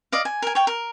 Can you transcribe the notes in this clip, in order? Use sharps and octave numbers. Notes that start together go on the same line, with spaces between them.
D5 D#5 F5
G#5
A#4 G#5
C#5 G5
A#4